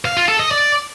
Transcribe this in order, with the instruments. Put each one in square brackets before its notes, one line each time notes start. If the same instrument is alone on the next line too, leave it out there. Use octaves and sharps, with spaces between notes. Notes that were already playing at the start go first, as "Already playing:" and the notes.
[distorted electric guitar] F5
F4
A4
D#5
D5